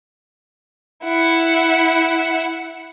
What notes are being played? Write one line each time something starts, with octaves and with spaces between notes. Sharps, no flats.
E4 F#5